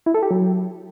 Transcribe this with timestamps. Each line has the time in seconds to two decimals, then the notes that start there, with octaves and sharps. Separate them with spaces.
0.06 E4
0.14 A4
0.23 G4
0.31 F#3